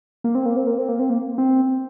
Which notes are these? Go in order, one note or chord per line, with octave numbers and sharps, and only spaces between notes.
A#3
C4
A#3
C4
A#3
C4
A#3
C4
A#3
C4